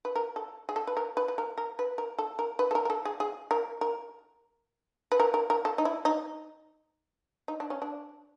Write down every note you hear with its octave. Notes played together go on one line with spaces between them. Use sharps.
B4
A#4
A4
G#4
A4
B4
A#4
B4
B4
A#4
A#4
B4
A#4
A4
A#4
B4
A4
A#4
A#4
A4
G#4
G#4
A#4
A#4
B4
A#4
A#4
A#4
A4
D#4
E4
D#4
D#4
D4
C#4
D4